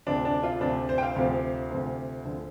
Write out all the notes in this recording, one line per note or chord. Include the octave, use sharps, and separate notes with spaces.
D2 C3 F3 D4
D4
F4
D2 C3 F3 D4
C5
G5
F5
D2 C3 F3 F5
D2 C3 F3
D2 D3 F3